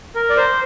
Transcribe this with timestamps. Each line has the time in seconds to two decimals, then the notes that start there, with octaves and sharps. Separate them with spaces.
0.15 A#4
0.30 D5
0.37 C5